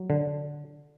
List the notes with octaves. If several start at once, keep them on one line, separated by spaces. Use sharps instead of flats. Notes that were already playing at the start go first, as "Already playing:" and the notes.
Already playing: F#3
D3